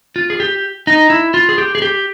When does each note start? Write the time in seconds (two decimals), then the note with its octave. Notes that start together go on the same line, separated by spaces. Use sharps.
0.16 F4
0.30 G#4
0.40 G4
0.87 D#4
1.10 E4
1.34 F4
1.49 G#4
1.58 G4
1.75 G#4
1.82 G4